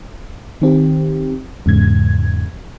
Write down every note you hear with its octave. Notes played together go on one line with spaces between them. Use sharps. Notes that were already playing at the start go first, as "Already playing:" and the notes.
D#3 C4 G4
E2 G#2 C#3 G#6